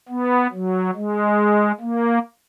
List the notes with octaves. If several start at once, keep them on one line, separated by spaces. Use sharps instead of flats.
B3
F#3
G#3
A#3